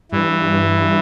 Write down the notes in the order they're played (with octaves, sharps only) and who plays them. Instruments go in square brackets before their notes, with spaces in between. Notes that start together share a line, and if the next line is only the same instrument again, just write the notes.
[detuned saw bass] G2 [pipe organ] E3